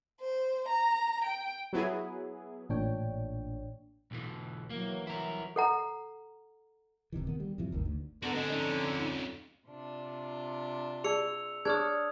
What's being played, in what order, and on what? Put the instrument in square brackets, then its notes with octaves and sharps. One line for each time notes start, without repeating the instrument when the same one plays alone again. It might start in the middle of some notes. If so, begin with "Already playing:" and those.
[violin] C5
A#5
G5
[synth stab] F#3 B3 E4 G#4
[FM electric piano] A1 A#2 D4 C#5 G5
[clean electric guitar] B1 B2 E3
[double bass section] E3 F#3 [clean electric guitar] A#3
[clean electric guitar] E4 A#4
[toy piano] A4 F#5 A#5
[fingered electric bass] D1 C3 D#3 E3
D#3 B3
G3
F#2 C3 E3 F3
G1 D2 D#3
D2
[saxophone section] D3 [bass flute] B3 [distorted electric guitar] F#4 A#4
[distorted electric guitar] C4 G#4 [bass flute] D#5
[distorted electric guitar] F2 C#4 [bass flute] D#4
[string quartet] C3 D4 F4
[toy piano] G#4 D5 A5 [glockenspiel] E6 C#7 F7
[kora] D4 C#5 [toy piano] G#4 [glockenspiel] D#6 F6 G#6